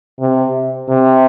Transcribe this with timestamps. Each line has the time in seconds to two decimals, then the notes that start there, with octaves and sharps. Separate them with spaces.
0.20 C3
0.89 C3